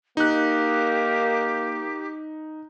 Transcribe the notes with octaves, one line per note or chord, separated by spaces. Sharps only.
A#3 D#4 G4 F#6